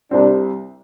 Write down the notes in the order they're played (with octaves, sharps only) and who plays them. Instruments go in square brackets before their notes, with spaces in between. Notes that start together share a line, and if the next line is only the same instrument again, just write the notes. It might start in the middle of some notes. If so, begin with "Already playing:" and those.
[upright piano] C2 C3 G3 C4 [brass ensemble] D4